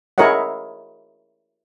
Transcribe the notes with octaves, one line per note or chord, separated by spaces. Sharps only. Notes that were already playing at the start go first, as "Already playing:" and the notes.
E4 G#4 A#4 C#5 D#5 F#5